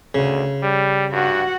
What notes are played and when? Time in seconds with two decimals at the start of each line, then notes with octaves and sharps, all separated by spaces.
0.15 D2 C#3
0.63 G3
1.12 G2 F#4 F#5